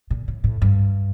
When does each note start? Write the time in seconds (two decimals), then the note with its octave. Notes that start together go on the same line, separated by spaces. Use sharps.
0.10 A#2
0.28 A2
0.44 A2
0.62 G2